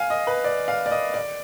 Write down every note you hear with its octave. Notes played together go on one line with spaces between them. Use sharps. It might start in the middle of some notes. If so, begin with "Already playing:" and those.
Already playing: F5 G#5
D#5
B4
D5
F5
D5
D#5
D5